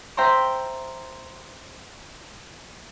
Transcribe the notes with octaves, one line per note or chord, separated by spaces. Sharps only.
C5 E5 G5 A#5 C6